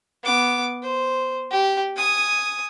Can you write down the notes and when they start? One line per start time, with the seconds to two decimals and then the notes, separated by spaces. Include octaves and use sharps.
0.23 B3 D6
0.82 C5
1.51 G4
1.96 G#5 D#6